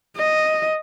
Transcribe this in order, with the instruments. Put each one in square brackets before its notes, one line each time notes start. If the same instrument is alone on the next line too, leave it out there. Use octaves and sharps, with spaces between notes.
[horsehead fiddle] D#5